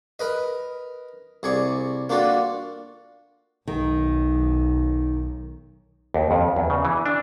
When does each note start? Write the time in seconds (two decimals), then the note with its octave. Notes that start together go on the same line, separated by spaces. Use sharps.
0.19 A#4 B4 D#5
1.43 C2 G#4 D5 C#6
2.09 A#3 D4 F4 F#4 A4
3.67 B1 D#3
6.14 D#2
6.31 F2
6.56 E2
6.70 C#3
6.85 E3
7.06 D4